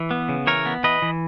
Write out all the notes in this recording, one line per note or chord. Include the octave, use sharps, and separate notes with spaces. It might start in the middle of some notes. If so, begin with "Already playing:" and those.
Already playing: E3
B3
C#3
E3 A#4 C#5
B3
E3 B4 D#5
E3